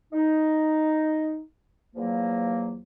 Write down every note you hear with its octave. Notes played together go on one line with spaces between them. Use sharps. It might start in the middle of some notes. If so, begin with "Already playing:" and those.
D#4
E2 F3 F#3 A#3